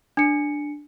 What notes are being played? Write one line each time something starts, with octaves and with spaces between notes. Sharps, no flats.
D4 C#7